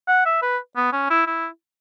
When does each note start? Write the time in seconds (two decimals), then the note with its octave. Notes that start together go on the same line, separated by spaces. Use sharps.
0.08 F#5
0.26 E5
0.42 B4
0.76 B3
0.92 C#4
1.10 E4
1.27 E4